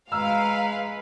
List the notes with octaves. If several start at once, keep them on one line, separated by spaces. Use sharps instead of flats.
G#3 B4 F5 A#5 E6 F6